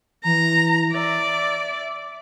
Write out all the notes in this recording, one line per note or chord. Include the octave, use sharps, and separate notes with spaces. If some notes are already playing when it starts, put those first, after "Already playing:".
E3 A#5
D5 E5